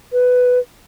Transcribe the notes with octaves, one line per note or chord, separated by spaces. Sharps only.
B4